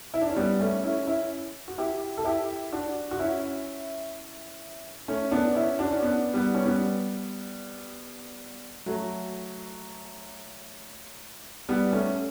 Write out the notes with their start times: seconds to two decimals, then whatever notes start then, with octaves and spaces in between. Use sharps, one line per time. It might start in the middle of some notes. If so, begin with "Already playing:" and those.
0.14 E4
0.21 D4
0.29 C#4
0.36 G3 B3
0.60 A3 C#4
0.84 C#4 E4
1.07 C#4 E4
1.68 F#4
1.78 E4 G4
2.17 A4
2.25 E4 G4
2.72 D4 F#4
3.11 F#4
3.19 C#4 E4
5.08 A3 C#4
5.31 B3 D4
5.55 C#4 E4
5.79 D4 F#4
5.91 C#4
6.02 B3 D4
6.34 G3 B3
6.55 C#4
6.65 G3 B3
8.86 F#3 A3
11.69 G3 B3
11.93 A3 C#4